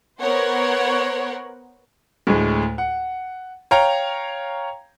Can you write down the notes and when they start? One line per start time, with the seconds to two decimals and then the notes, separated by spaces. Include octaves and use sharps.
0.20 B3 A#4 C5 C#5 F#5
2.27 D2 A2 G#3
2.78 F#5
3.71 C#5 F5 G5 A#5